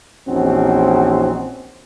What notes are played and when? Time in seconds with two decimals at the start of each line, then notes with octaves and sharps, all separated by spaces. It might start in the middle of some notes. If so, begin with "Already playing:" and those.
0.27 A#1 E2 C4 C#4 D#4 F#4